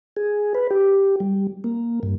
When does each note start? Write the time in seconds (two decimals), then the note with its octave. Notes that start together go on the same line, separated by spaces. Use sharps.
0.17 G#4
0.55 B4
0.71 G4
1.20 G3
1.64 A#3
2.03 G2